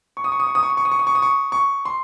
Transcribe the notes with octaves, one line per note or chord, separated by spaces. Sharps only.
C#6
D#6
C#6
D#6
C#6
D#6
C#6
D#6
C#6
D#6
C#6
D#6
C#6
D#6
C#6
C#6
C6